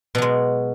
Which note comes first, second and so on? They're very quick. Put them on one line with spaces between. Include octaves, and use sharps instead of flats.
B2 F#3 G#3